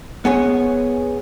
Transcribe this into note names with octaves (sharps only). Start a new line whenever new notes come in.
B3 G#4 C#5